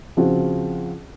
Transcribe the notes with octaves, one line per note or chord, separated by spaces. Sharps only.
C#3 F3 C4 F#4